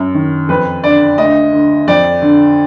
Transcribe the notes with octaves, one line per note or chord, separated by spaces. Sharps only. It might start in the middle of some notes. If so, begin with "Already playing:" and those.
Already playing: F#2
D#3
F2 B4
D3 D5
D2 D#5
D3
F2 D5
D3